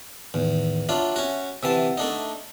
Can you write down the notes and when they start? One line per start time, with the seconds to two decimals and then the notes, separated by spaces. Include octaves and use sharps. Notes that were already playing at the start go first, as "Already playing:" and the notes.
0.34 E2 A2 D#3
0.89 F#3 D4 F4 E5
1.16 C#4 F#4
1.63 C3 E3 E5 F#5 A5 E6
1.97 A3 D4 D#4